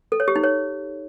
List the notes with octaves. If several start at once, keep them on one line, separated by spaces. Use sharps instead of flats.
A4
C#5
G4
D#4
C#5